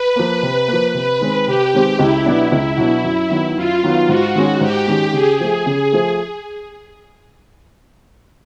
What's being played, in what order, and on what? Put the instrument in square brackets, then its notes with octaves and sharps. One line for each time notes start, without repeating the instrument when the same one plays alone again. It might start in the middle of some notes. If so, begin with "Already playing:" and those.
Already playing: [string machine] B4
[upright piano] F3 A#3
C3
A#3
F3
[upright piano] C3 [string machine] B4
[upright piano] D#3 G#3 C4
[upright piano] C3 [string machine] G4
[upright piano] D#3 G#3 C4
[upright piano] C#2 [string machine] E4
[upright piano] B2 F#3 B3 D4
C#2
B2 F#3 B3 D4
F#2
D#3 F#3 B3
[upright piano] F#2 [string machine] F4
[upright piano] D#3 F#3 B3
[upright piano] G#2 [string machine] F#4
[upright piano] D#3 G#3 C#4
[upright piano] G#2 [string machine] G4
[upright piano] D#3 G#3 C#4
[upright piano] C#3 [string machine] G#4
[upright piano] F3 A3
C#3
F3 A3